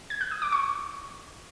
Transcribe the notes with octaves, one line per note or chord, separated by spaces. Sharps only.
G#6
F#6
D#6
D6
C#6